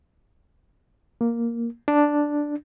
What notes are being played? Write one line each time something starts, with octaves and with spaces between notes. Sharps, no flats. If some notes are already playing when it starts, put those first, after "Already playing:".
A#3
D4